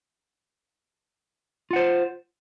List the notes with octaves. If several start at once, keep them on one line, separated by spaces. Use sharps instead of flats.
F4 C5 F#5